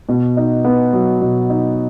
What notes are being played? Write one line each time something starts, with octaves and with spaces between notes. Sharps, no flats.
B2
D#4
B3
F#3
B2
D#4